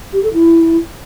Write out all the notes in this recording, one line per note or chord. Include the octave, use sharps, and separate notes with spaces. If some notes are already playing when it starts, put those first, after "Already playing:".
G4
A4
E4